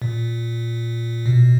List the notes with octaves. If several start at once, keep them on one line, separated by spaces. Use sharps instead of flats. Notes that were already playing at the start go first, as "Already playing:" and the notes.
A#2
B2